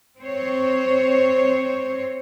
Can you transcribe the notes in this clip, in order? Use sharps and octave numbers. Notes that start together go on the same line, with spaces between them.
C4 C5 C#5